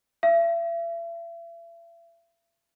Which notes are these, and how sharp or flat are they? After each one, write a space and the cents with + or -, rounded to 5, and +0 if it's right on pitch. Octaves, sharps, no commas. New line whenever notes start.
E5 +40